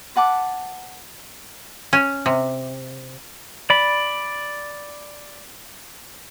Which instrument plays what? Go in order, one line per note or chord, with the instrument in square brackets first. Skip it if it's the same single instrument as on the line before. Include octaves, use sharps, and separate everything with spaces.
[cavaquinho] B4 F#5 A5 D6
[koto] C#4
C3
[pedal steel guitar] D5 B5